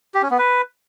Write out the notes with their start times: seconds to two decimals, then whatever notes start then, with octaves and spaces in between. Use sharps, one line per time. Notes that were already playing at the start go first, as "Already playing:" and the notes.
0.14 G4
0.22 C#4
0.30 B3
0.38 B4